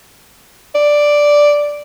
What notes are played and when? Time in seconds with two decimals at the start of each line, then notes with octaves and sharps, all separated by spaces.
0.75 D5